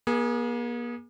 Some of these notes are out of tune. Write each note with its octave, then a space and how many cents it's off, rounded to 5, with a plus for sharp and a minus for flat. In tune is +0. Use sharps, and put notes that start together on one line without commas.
A#3 +45 G#4 +0